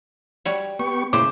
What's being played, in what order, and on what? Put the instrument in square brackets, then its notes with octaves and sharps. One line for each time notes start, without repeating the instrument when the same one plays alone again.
[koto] G3 F#4 C#5
[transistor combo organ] B3 G4 C#6
[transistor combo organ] A#2 E4 [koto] C#3 G#3 C5 [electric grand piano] D6